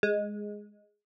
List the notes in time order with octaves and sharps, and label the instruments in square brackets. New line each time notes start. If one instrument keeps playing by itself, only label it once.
[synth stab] G#3